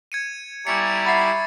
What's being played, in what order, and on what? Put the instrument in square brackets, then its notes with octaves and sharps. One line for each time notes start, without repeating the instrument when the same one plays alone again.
[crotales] G#6 C#7 D#7
[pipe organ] G3 E4 [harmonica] D5 G#5 A#5 [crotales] C#6 B6 C#7
[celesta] E5 F#5 B5 [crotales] D6 A6 C7